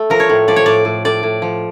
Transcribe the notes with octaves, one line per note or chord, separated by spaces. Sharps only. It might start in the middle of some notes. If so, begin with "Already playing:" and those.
Already playing: A3
F3 A#4
C#5
A2
F3 D5
C#5
A2 D5
A2
A2 D5
A2
F3